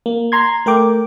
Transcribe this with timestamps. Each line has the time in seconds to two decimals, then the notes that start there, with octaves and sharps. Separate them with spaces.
0.06 A#3
0.32 A#5 C6 G#6
0.66 A3 A#4 G5 D6